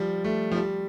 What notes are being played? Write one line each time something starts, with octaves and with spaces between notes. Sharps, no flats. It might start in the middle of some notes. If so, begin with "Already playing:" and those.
Already playing: F3 G3
A3
F3
G3